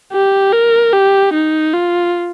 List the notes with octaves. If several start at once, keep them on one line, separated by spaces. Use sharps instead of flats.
G4
A#4
G4
D#4
F4